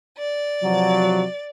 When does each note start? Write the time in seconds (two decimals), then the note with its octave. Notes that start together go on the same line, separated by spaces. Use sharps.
0.19 D5
0.63 C3 F3 F#3